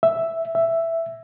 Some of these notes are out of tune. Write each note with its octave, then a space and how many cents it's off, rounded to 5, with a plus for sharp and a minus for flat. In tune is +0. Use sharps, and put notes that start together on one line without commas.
E5 +0
E5 +5